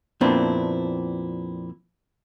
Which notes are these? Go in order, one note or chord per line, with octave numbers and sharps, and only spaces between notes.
F2 A#2 B3 C4 D4 E4